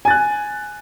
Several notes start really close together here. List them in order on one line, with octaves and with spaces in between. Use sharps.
G#5 A6 F#6